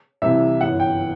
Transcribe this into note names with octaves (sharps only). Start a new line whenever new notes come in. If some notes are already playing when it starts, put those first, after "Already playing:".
C2 C3 E3 E5
G1 F#2 E3 F#5
G5